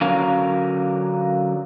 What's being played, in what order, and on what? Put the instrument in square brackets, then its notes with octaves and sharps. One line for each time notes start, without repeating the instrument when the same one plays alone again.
[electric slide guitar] D3 F#3 C#4 A#4 F5